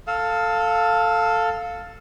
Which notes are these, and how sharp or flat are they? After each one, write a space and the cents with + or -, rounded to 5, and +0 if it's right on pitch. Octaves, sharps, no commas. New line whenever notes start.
A4 +10 F5 +10 E6 -25